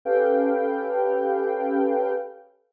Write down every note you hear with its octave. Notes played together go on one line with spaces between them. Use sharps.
C#4 G4 A4 B4 F5 G5